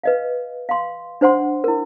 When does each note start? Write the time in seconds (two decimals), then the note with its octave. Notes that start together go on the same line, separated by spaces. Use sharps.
0.04 B4 D#5 F5
0.69 F5 C6
1.21 D4 C5 F#5 C6
1.64 E4 A#4